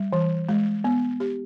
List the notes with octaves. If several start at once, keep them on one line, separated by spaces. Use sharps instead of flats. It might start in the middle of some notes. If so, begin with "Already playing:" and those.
Already playing: G3
E3
G#3
B3
G4